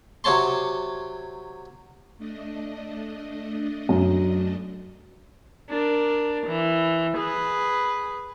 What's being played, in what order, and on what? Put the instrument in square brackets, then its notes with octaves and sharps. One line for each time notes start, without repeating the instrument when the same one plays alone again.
[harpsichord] C3 F#3 C#5 A5 C6
[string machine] A3 D4 D#5
[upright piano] F#2
[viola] D4 A#4
E3
G#4 B4